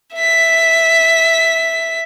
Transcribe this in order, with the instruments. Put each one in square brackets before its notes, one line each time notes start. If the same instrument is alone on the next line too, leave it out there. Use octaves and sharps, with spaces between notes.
[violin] E5 B6